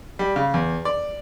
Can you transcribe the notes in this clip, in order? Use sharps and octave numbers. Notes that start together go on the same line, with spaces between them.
G3
C#3
E2
D5